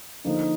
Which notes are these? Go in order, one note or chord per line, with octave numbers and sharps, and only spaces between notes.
D3 F3 A#3 D#4